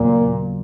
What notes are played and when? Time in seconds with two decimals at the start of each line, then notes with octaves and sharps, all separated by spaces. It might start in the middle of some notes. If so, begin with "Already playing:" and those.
Already playing: D#2 A#2 C#3 F#3 B3